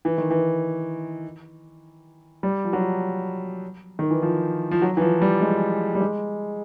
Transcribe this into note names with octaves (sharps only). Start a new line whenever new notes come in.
E3
D#3
E3
G3
F3
F#3
D#3
E3
F3
F3
F#3
E3
F3
G3
G#3
G3
G#3